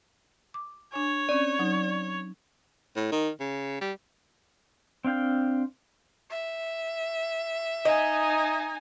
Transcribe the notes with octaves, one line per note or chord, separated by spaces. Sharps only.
D6
D4 C#5 G#5
C4 C#4 D5
F#3 D#4
A2
D#3
C#3
G3
C4 D4 F5 G5
E5
D#4 D#5 G#5